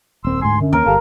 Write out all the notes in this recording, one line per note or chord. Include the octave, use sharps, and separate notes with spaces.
D#1 C2 C4 C6 E6
D2 G#2 G#5 C6
F#2 D3
D#2 A#3 C#4 A#4
G1 G4 A4 F5